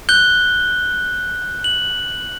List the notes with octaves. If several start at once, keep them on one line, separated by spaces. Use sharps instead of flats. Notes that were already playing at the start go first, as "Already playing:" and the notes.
F#6 G6 G7
F#7